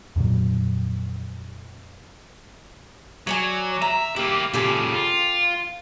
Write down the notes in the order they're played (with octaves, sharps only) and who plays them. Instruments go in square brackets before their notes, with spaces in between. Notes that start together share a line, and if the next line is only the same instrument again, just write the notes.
[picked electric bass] F2 A#2 D3 F#3
[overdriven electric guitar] F#3 [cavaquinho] C#5 D5 G#5
[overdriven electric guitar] E5 [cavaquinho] A#5
[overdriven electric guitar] A#3 E4 [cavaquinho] G4
[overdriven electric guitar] A#2 C#3 [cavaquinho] G4 A4 G#5
[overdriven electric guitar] F4